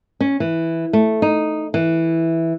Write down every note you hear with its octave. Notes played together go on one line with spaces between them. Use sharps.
C#4
E3
A3
D#4
E3